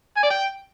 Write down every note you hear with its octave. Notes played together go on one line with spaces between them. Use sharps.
G#5
D5
G5